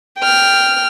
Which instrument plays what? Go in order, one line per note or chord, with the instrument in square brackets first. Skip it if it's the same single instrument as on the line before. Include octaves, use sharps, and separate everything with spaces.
[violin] G5 F6